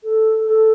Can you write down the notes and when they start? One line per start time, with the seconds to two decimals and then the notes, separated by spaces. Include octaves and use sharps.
0.04 A4
0.45 A4